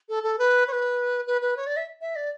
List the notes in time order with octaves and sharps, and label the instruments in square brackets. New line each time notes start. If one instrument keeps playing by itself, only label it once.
[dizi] A4
A4
B4
C#5
B4
B4
B4
C#5
D5
E5
E5
D5